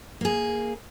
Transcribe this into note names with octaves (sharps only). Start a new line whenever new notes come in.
A#3 G#4